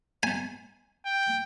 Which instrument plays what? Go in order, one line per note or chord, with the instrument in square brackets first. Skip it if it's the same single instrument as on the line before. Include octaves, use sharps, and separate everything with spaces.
[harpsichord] G#5
[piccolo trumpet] G5